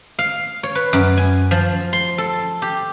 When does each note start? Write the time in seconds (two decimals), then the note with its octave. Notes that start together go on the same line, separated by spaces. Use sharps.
0.19 F5
0.63 C#5
0.75 B4
0.93 F#2
1.17 G#5
1.51 F3
1.93 C6
2.18 A4
2.62 G4